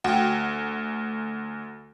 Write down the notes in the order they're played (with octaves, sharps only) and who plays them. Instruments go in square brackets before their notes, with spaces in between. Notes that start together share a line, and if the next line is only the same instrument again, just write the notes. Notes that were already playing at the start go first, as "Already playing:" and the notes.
[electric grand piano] D2 [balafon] F#4 G5 [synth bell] F#5